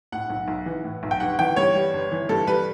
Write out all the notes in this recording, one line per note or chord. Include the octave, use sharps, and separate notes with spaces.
A2 F#5
B1
B1
E3
A2
B1
G5
G1 F#5
E3 G5
G2 C#5
G3
G1
E3
G2 A4
G3 B4